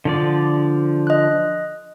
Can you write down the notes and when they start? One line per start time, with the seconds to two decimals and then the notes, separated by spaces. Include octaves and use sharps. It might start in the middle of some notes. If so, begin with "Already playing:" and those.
0.05 D3 F3 D5
1.07 D#5 F#6